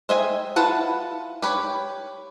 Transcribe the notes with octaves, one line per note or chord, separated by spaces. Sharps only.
C5 D#5 E5 G5 G#5
E4 F4 B4 F#5 A5
G4 B4 C#5